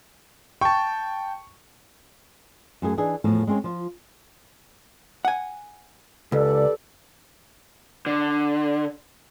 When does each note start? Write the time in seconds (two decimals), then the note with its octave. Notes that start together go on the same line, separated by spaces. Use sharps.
0.61 G5 A5 C#6
2.82 F#2 A3 G#4
2.98 E3 D4 D#4 G#4
3.24 E2 A2 F3
3.47 G#3 C4 C#4 C#5
3.64 F3 F4
5.25 F#5 G#5
6.32 C#2 G4 A4 B4 D5
8.06 D3